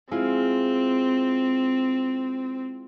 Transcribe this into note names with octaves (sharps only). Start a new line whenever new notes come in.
G#3 C4 E4 F4